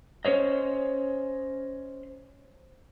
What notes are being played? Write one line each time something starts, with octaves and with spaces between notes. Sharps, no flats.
C#4 C5 C#5 D#5